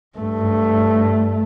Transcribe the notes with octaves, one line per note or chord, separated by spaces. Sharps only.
G2 A3